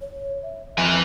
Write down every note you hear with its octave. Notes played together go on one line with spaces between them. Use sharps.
C#5
E5
F2 B4 G#5